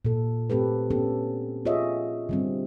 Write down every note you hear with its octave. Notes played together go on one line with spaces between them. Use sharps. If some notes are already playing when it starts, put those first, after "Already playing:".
A#2 A4
A3 C4 G4 A4 B4
B3 C#4 G4 A4
F4 G#4 C#5 D#5 E5
D3 G3 C4